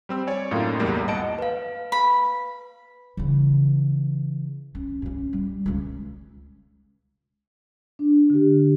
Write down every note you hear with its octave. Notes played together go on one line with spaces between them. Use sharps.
G3 C4 E6
C#5 D5 G#5
F#2 A2 A#3 D#4 F4
B1 E2 G3 A#3
G#1 D#5 F#5 A5 D7
B4 F5
B5
C#3 E3
C#4
G2 C#4
G3
C#2 C#3
D4
D3 G4